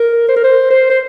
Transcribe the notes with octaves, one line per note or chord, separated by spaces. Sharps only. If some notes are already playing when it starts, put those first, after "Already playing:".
Already playing: A#4
C5
A#4
C5
C5
C5